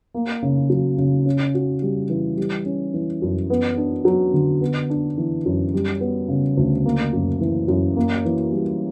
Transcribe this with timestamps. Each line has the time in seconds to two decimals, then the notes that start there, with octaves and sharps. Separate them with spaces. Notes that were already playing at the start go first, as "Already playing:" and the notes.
0.14 A#3
0.42 C#3
0.70 F#3
0.98 C#3
1.26 C#4
1.54 F#4
1.82 G3
2.09 E3
2.37 G3
2.65 C#4
2.94 E3
3.22 F#2
3.50 B3
3.77 D4
4.05 F#3
4.33 D3
4.61 B3
4.90 D4
5.18 E3
5.46 F#2
5.74 G3
6.00 B3
6.28 C#3
6.57 D2
6.85 A#3
7.13 F#2
7.41 E3
7.68 F#2
7.96 A#3
8.25 E3
8.52 G3